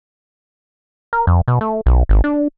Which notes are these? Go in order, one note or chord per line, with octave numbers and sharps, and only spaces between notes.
A#4
F2
B2
A3
B1
G#1
D4